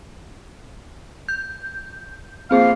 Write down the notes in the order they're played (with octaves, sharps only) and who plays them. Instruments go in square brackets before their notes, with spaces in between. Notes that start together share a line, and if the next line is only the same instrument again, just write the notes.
[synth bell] G6
[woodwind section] F3 A#3 F5 [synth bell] C4 G#4